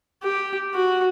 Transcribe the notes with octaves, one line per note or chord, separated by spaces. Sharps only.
G4
F#4